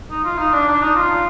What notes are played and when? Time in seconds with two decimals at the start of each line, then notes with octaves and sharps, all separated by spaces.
0.11 D#4
0.24 F4
0.38 D#4
0.53 D4
0.68 D4
0.82 D#4
0.96 F4